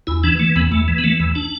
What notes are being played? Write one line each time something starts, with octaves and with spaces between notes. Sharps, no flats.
E2 E4
E3 D4
E3 A3
E2 B3
E2 A3
E3
B3
E3 A3
E2
D4